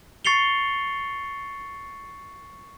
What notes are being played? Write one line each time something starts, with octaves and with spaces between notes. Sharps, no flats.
C#6 A6 C7 C#7 F7 G7